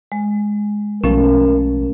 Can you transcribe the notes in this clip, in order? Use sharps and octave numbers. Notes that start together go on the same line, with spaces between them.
G#3
B1 F3 A3 C#4 A#4